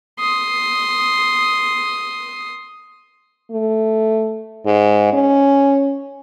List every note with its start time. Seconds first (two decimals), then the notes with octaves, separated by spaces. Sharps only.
0.19 C6 D#6
3.51 A3
4.66 G#2
5.13 C#4